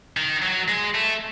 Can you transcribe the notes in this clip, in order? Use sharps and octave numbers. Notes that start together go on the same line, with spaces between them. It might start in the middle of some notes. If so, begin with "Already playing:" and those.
D#3
F#3
G#3
A3